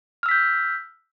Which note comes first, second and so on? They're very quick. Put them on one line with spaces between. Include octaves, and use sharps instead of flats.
F6 E6 B6 G6